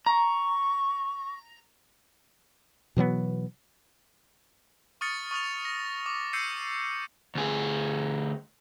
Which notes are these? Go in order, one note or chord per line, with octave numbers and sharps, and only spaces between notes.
A#5 C#6
B2 E3 F#3 B3
C#6 D#6 F6 A6 C#7
C#6 D#6 F6 F7
A#6
D6
E6 G6 C7 C#7 D#7
D2 G#4